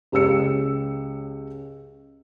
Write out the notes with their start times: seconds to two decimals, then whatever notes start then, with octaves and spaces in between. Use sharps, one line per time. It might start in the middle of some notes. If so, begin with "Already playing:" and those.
0.12 C#2 G4 C#5 E6 C#7